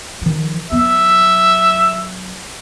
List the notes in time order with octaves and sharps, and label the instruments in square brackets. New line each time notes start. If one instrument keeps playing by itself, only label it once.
[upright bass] D#3 F3
[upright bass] F#3 B3 [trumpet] E5